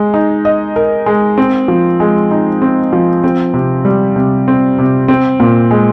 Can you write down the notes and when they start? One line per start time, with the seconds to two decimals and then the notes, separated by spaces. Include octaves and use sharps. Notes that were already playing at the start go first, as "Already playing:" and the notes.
Already playing: G#3
0.14 D#4
0.45 D#5
0.76 A#4
1.06 G#3
1.38 C4
1.68 F3
2.00 G#3
2.31 D#4
2.62 C4
2.93 F3
3.24 C4
3.54 C3
3.85 G3
4.16 C3
4.48 C4
4.79 C3
5.08 C4
5.40 A#2
5.71 G#3